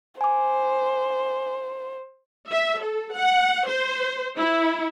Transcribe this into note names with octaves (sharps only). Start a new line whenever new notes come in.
C5 G#5 D6
E5
A4
F#5
C5
E4